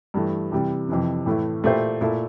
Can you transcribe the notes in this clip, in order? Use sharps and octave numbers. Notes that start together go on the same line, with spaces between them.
G2 E3 A3
C3 E3 G3
F2 C3 E3
A2 E3 A3 E4
A#2 A3 E4 G4 C5
A#2 A3 E4 A4